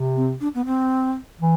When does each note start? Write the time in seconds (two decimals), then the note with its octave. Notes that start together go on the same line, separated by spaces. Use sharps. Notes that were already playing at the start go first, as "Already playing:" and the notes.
Already playing: C3
0.16 C4
0.41 D4
0.55 B3
0.65 C4
1.40 E3